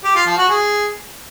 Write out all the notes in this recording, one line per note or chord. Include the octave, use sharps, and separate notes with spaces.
G4
F4
F3
F#4
G#4